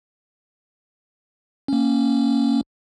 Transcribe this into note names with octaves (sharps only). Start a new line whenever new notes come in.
A#3 C#4